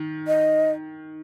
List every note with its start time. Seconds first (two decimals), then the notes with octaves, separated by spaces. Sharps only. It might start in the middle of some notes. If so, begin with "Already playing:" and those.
Already playing: D#3
0.27 D#5